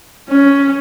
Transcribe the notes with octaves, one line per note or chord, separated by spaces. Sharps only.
C#4